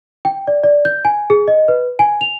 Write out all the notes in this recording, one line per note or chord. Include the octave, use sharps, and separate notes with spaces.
G5
D5
D5
G6
G#5
G#4
D#5
B4
G#5
F7